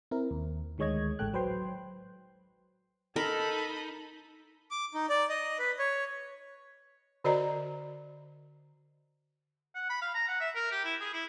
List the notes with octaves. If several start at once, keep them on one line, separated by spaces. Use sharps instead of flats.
C4 E4 A#4
D#2
D2 D#3 G#3 C#5 D#5 G#6
A1 G#3 A4 G5 F#6
F#3 B4 C5 G5 C6
D#4 A4 A#4 A5 B5
D6
D#4
D5
D#5
B4
C#5
D3 F#4 A#4 D5 D#5 A#5
F#5
B5
F5
A#5
F#5
E5
A#4
G4
E4
G#4
E4